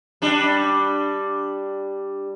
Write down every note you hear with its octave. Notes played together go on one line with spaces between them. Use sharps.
G3 D4